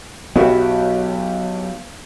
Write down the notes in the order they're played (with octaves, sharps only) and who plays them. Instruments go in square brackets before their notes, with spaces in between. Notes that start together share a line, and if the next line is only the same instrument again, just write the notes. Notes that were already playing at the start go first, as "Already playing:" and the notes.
[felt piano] B1 G4 B4 [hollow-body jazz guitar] F#3 E4 F#4 [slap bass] B3